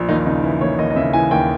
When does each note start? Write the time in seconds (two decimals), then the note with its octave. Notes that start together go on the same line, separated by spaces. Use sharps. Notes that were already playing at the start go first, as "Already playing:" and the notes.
Already playing: A#1
0.09 D#2 D#4
0.26 C#3 D#4
0.43 E3 E4
0.61 D#2 C#5
0.78 D#2 D#5
0.90 D#5
0.96 C#3 E5
1.13 E3 G#5
1.31 D#2 G5